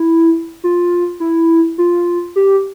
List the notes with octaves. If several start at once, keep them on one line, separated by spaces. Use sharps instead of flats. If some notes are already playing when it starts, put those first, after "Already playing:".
Already playing: E4
F4
E4
F4
G4